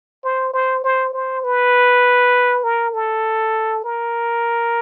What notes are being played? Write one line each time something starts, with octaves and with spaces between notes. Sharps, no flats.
C5
C5
C5
C5
B4
A#4
A4
A#4